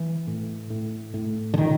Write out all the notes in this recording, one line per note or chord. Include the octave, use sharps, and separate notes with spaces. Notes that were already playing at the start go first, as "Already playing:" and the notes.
Already playing: E3
A2
A2
A2
D3
A#2 D#3